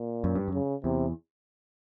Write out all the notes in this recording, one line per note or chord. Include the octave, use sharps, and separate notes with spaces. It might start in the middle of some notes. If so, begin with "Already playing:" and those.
Already playing: A#2
F#2
G2
F#2
C#3
E2 C3